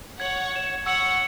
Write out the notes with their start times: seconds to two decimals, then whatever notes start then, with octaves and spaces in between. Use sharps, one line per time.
0.19 C#5 F#5 G#6 C#7 F#7
0.53 G#6 E7
0.86 C#5 F#5 C#6 E6 C#7 F#7